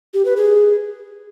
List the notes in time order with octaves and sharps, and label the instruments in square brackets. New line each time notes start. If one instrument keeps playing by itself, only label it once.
[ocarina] G4
B4
G#4